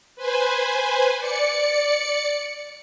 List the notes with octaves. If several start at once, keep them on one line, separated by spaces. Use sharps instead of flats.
B4 C5 G#5
D5 C#7